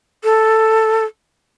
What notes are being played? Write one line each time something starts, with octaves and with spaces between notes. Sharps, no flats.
A4